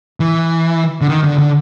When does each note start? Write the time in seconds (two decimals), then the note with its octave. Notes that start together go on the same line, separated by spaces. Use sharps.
0.20 E3
1.01 D3
1.09 D#3
1.24 D3
1.38 D3